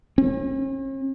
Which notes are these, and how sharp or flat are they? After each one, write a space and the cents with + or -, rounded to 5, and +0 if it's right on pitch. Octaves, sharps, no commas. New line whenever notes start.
C#4 -45